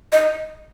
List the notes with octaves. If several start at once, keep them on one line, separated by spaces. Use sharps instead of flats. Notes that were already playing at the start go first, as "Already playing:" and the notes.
D#5